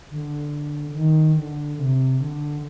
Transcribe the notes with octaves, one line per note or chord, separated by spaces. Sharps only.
D3
D#3
D3
C3
D3